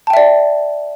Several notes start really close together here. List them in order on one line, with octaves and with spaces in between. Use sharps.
A5 G5 E5 D5